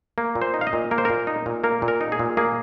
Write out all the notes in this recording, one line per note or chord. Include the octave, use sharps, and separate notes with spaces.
A#3
A#2
C5
D#4
F5
D#5
A#2
A#3 A#4
C5
A#2 A#4
D#4
A#2
A#3 A#4
A#2
A#4
D#4
G#4
A#2
A#3 G#4